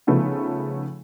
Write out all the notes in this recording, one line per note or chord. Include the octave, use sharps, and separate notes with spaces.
C#3 F3 A3 B3 D#4